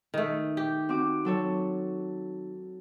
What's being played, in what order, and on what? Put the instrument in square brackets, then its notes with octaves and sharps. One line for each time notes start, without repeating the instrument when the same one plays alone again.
[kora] D#3 A3
G4
[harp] C4 F#4 D6
F#3 A4 C#5